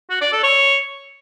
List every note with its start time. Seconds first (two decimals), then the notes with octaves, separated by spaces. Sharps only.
0.10 F#4
0.21 D5
0.32 A4
0.44 C#5